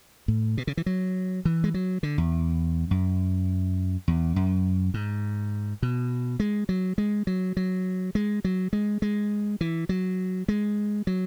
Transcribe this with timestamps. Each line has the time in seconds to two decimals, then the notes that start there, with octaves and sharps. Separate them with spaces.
0.28 A2
0.57 B2
0.67 C#3
0.77 E3
0.86 F#3
1.45 E3
1.64 G#3
1.74 F#3
2.03 D3
2.18 E2
2.91 F#2
4.08 E2
4.36 F#2
4.94 G#2
5.82 B2
6.40 G#3
6.69 F#3
6.98 G#3
7.27 F#3
7.57 F#3
8.15 G#3
8.44 F#3
8.73 G#3
9.02 G#3
9.61 E3
9.89 F#3
10.48 G#3
11.07 F#3